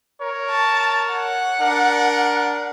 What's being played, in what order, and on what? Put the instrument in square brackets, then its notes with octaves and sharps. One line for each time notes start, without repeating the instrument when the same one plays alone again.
[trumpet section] A#4 C#5
[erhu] A5
F#5
[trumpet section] D4 A#4